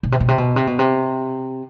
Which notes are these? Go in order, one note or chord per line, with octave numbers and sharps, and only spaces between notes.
B2
C3
B2
C3
B2
C3
B2
C3